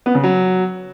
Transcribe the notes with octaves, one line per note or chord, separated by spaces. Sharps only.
B3
C#3
F#3